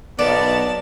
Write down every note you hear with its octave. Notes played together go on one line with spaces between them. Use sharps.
B1 B3 A#4 D5 A5